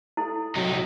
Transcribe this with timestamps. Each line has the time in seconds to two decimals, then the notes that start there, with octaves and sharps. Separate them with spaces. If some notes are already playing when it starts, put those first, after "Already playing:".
0.17 E4 A4
0.56 C3 F#3 D#4